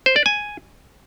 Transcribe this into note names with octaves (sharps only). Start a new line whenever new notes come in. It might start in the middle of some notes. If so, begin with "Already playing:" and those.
C5
D5
G#5